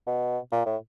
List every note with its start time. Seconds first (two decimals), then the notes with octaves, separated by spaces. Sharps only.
0.07 B2
0.52 A#2
0.66 A2